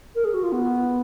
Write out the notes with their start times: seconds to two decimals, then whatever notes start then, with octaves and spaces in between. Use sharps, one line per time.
0.15 A#4
0.25 G#4
0.34 F#4
0.43 F4
0.52 B3